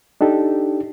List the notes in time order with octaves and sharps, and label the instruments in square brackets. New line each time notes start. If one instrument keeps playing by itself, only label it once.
[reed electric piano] D4 D#4 G4 A4